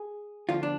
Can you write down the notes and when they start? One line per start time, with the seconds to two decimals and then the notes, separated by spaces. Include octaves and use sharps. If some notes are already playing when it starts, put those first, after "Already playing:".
Already playing: G#4
0.49 D2 D3 F3 F4
0.63 D4